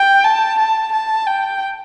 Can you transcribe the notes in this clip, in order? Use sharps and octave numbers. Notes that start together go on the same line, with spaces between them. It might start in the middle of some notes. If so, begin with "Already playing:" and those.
Already playing: G5
A5
A5
A5
G5